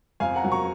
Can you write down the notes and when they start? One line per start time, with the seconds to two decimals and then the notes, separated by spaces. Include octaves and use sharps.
0.20 F2 F5 G#5
0.36 F#5 A#5
0.44 F#3
0.52 A#5 C#6